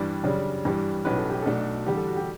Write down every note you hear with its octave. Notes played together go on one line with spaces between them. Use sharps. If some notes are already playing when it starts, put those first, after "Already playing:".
Already playing: G2 E3 G3 D4
F#2 C#3 G3 D4
G2 E3 G3
B1 A2 G3 C#4 B4
A4
G4
B1 B2 A3 D4 A4
E2 D3 G3 G4
A4
F#4
G4